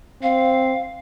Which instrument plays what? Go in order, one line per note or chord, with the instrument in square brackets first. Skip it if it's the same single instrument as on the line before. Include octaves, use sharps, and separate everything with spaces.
[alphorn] C4 [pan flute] F5